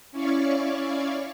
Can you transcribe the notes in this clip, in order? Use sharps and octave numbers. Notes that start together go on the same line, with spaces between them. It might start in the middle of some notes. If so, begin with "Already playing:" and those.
C#4 E4 C#5 D5 F5 C#6